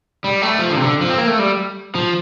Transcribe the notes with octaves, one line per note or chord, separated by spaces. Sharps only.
G3
A3
F3
D3
C3
D3
F3
C4
A#3
A3
G3
F3